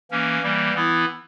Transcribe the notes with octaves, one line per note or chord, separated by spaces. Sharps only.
E3 A#3 C#4
E3 G3 A#3
E3 B3 E4